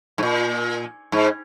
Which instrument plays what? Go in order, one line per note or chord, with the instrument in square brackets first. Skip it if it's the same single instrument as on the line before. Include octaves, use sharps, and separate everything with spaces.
[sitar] G#2
A#2
G#2